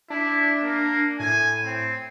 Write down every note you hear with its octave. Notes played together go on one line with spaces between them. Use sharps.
D4 E4
A#3
A2 G#5
C4